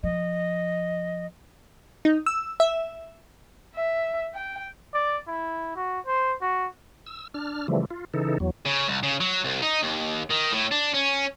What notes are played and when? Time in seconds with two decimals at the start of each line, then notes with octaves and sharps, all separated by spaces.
0.03 F3 D#5
2.05 D#4
2.26 E6
2.60 E5
3.75 E5
4.34 G5
4.94 D5
5.27 E4
5.76 F#4
6.05 C5
6.42 F#4
7.06 E6
7.34 D4 F6
7.68 C#3 E3 F3 G3 A3
7.90 F4
8.14 C#3 E3 D#4 A4
8.40 E2 F#3
8.66 C#3
8.88 C2
9.03 C#3
9.20 F#3
9.45 C2
9.62 D#4
9.83 D#2
10.31 D#3
10.52 A2
10.72 D4
10.94 C#4